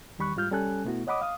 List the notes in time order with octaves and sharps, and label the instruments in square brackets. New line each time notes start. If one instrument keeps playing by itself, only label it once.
[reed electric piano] E2 D#3 G3 B5 C#6 F#6
G#2 G3 F4 F6 G6
C2 G3 C#4 A4 G#5 F#6
B2 A3 B3 E4 F#4
C#5 D#5 F#5 B5 D6 D#6
F5 D#6